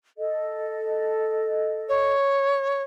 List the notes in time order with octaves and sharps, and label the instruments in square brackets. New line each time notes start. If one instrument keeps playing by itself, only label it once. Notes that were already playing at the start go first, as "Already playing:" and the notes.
[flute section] A4 D#5
[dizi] C#5